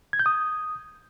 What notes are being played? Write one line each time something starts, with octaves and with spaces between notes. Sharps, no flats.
G#6
G6
D#6